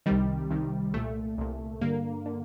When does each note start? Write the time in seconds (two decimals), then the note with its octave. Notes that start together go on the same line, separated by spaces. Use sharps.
0.06 C2 C3 D#3 G3
0.51 C2 C3 D#3
0.94 C2 A#2 A3
1.38 C2 A#2
1.81 G2 D3 A#3
2.26 D3